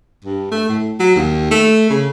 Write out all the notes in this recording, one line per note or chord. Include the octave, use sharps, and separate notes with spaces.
G2
A3
A2
F#3
D#2
A3
C#3